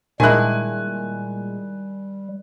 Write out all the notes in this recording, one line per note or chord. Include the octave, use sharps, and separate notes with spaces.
A#2 D#3 G3 G#3 D4 E4 G#5 F#6